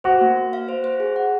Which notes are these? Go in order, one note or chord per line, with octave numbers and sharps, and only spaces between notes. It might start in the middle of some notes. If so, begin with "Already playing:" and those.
F#4 C5
A#3
A#3
F5
C5
C5
G#4
F#5